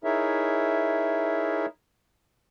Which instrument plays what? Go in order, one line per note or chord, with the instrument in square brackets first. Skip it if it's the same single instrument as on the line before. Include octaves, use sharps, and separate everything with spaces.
[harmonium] D#4 E4 G#4 A#4 C#5 E5